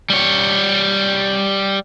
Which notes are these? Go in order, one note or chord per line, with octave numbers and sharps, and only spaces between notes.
G3 C#5